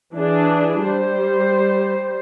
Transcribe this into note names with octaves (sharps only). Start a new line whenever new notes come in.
E3 D4 G#4
G3 C5